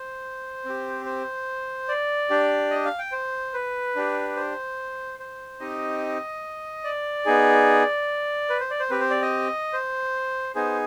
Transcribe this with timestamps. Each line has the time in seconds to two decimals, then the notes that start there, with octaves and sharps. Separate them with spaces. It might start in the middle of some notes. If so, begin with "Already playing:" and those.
Already playing: C5
0.65 C4 G4
1.05 C5
1.88 D5
2.30 D4 G4
2.71 D#5
2.85 F5
2.99 G5
3.12 C5
3.54 B4
3.96 D4 G4
4.37 C5
5.20 C5
5.60 C4 D#4 G4 D#5
6.84 D5
7.26 B3 D#4 G#4
8.50 B4
8.60 C5
8.70 D5
8.80 C5
8.90 C4 G4 B4
9.01 C5
9.11 D5
9.22 D#5
9.73 C5
10.55 B3 D#4 G#4 C5